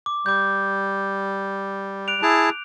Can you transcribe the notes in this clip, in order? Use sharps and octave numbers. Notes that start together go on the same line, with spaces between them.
D6
G3 D6 G6
F#6 D7 F7
E4 G#4 A5